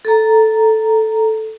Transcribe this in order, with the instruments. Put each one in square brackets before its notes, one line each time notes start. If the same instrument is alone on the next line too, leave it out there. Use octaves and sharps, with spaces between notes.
[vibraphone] A4 A#5